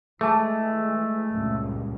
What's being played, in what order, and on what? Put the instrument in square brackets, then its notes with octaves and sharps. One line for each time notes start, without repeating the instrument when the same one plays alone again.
[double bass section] E3 G#3 [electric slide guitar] A3 [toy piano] G#4 A5
[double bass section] C#2 G2 A#2